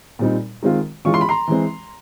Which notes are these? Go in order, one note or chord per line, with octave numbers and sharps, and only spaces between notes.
A#2 G3 C4 D#4
D#3 G#3 C4 F4
E3 G#3 C#4 F4 C#6
C6
B5
A#5 C6
E3 G#3 C4